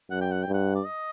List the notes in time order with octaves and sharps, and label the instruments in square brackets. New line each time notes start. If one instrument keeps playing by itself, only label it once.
[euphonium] F#2 [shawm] F#5
[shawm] G5
F#5
[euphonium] G2 [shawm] G5
[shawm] F#5
D5
D#5